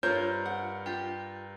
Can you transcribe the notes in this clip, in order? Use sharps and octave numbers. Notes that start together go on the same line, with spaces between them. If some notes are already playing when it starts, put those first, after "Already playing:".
G2 F4 A#4 C5 C#5 G6
F#5
F4 G4